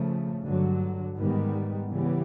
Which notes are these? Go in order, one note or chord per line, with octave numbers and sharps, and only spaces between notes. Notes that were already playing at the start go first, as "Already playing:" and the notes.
Already playing: C#3 F3 A3
G2 D3 F#3
G#2 D#3 G3 B3
C#3 E3 G3 B3